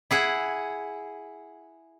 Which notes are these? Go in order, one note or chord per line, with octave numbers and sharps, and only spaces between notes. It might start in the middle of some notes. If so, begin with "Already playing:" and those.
E4 G#4 F#5